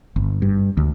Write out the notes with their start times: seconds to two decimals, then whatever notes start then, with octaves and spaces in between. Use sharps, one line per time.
0.16 G1
0.42 G2
0.77 D2